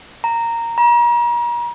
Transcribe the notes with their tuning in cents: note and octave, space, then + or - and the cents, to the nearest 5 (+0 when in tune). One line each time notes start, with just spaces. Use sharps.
A#5 -10
A#5 +40